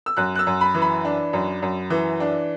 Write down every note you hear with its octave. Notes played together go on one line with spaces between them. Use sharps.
E6
F#2 F#6
F#6
E6
F#2
B5
E3
B5
D4
F#2
F#2
E3
D4